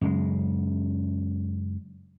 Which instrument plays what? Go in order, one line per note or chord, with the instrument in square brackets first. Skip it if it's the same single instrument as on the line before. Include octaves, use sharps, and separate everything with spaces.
[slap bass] F#2 C#3 G#3